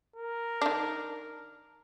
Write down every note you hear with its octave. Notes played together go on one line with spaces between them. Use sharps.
A#4
D#3 D4